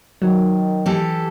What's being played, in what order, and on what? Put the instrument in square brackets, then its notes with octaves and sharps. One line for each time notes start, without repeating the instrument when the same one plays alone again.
[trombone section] D#3 [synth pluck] F#3
[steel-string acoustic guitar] E3 G4 A4